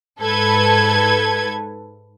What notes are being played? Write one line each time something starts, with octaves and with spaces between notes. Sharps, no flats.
G#2 A4 B4 G#6